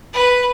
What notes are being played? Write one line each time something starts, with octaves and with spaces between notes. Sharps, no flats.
B4